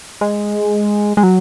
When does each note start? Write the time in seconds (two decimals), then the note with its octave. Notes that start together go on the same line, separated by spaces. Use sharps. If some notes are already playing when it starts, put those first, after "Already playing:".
0.21 G#3
1.17 G#3
1.23 F#3